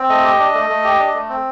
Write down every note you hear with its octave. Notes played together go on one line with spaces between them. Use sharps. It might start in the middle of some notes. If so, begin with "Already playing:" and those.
Already playing: C4
A3 D#5
G4
D4
A3
A3
G4
D4
A3
C4